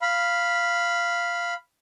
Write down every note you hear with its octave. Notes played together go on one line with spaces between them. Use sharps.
F5 B5